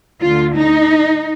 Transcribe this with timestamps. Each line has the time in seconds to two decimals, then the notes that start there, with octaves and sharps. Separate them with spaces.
0.21 D2 D3 F4
0.55 D#4